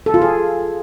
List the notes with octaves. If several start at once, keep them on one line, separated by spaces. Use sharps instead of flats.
A4
F4
G#4